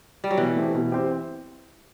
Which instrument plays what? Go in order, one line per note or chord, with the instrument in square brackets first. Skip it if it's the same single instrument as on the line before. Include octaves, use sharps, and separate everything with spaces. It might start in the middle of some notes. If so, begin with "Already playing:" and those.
[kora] G3
F#3
[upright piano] B2 [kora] E3
[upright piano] A3 C4 G4
B2
C4 G4